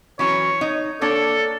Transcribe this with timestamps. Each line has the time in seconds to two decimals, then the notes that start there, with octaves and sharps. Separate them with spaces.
0.19 E3 F#3 C#4 C#5
0.61 D#4
1.01 A#3 D4 A4 C#5